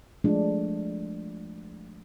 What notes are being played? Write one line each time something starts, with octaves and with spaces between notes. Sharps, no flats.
F3 G#3 A3 D4